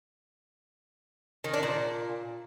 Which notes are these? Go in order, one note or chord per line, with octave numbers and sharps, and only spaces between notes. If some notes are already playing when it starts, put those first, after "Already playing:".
D#3
D4
A#2